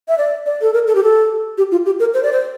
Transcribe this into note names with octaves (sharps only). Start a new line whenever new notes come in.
E5
D5
D5
A4
A#4
A4
G4
A4
G4
F4
G4
A#4
C5
D5
C5